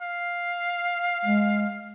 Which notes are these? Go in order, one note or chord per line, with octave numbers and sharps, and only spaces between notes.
F5
G#3